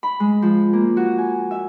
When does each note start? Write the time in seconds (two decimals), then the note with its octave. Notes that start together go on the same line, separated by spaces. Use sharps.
0.03 B5
0.20 G#3
0.42 F3
0.73 A#3
0.97 F#4
1.18 G#5
1.51 E5